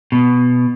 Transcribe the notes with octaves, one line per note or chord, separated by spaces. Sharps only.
B2